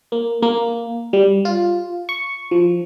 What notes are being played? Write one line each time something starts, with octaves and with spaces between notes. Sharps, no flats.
A#3
A#3
G3
F4
C#6
F3